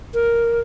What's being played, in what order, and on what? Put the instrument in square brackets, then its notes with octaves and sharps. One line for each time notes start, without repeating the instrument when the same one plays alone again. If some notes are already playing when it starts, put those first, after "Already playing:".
[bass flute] A#4